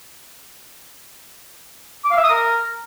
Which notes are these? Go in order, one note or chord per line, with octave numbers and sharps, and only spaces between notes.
D6
F5
E5
D#6
A#4